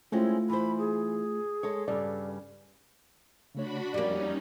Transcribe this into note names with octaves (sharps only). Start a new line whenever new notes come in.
G#3 A3 C4 C#4 E4 F4
E3 C5 B5
G#4
G#3 A4 C#5
G2 C#3 G3 A4 D5
C#3 A3 D4 F#4 C#5 B5
F2 F3 G3 A#3 C#4 D#4 D5